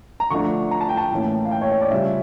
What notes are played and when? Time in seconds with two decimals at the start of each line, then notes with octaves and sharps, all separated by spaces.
0.20 A#5
0.30 D3 F3 A3 D4 C#6
0.71 A#5
0.81 A5
0.89 G5
0.97 A5
1.11 A2 E3 A#3 C#4
1.45 F5
1.51 G5
1.62 C#5
1.72 C#5
1.81 D5
1.91 C#3 G3 C#4 F4 E5